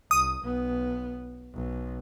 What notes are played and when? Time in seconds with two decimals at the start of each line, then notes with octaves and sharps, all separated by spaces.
0.11 C2 D#6
0.43 B1 B3
1.53 B1